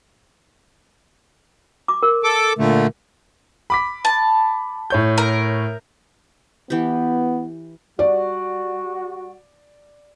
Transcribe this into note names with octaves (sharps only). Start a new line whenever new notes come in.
D6
A#4
A4 D6
A#2 D3 A3
B5 D6 B6
A5
A2 C#5 G6
A#4
E3 B3 G4
G3 F#4 D5